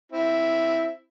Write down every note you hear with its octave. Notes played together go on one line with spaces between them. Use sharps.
C4 E4